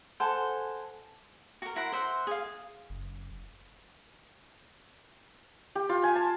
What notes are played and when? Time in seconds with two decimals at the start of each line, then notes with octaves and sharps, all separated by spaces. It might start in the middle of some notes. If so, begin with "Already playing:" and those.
0.20 A4 C5 F#5 G#5
1.62 F#4 A#4
1.76 E4 A#4 F#5 C6
1.92 C5 E5 F#5
2.27 G#4 F5
2.90 F#1
5.75 G4
5.89 F4
6.03 G#5
6.15 A5